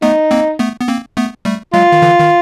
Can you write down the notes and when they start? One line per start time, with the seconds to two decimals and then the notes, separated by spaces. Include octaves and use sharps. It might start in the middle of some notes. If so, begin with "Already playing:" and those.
0.02 A3 B3 D#4
0.31 A#3 C4
0.59 A3 B3
0.81 B3
0.88 A#3 C4
1.17 A3 B3
1.45 G3 A3
1.73 F#3 G#3 F4
1.92 D#3
2.02 D3 E3
2.20 D#3